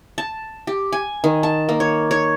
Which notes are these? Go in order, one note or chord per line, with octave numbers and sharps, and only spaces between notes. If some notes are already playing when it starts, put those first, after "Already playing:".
A5
G4
G#5
D#3
A5
A#3
C#5
C#5